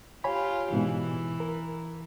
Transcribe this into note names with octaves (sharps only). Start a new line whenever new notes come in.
F4 G4 C#5 G#5 B5
G#2 B2 E3
A#4